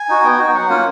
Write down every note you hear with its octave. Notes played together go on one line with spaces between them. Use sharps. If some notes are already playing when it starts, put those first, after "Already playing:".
Already playing: G#5
D#4 F#4
B3 G5
D#4 F#4
F#3 F#5
A#3 C#4 F4